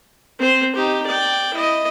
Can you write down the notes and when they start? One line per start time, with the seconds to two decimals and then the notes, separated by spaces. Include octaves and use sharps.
0.39 C4 C5
0.75 D#4 G4
1.07 D5 G5
1.53 E4 D#5